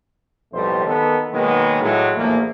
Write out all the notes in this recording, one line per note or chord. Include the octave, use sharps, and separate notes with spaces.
B1 F2 A2 G3 A3 C5
D#3 B3 A4
B2 D#3 F#3 G#3 A#3 B3
A2 F#3 G#3
A#1 E2 A3 A#3